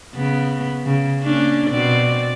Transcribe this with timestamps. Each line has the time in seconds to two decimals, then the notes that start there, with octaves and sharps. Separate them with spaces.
0.15 C#3 B3
0.86 C#3
1.23 A#3 C#4 D4
1.69 B2 C4 D5